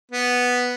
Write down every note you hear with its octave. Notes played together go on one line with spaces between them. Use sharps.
B3